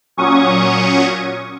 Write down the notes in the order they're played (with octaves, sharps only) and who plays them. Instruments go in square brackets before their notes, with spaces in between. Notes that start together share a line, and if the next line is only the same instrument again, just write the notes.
[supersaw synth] A#2 F#3 C#4 C#6 D#6